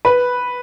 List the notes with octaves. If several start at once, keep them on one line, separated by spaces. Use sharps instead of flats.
B4